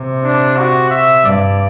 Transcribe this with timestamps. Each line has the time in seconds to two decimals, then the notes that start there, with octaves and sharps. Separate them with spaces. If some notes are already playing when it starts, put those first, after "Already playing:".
Already playing: C3
0.23 D4
0.57 F#4
0.90 E5
1.24 G2 D5